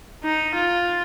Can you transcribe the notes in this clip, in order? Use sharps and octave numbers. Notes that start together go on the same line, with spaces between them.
D#4
F4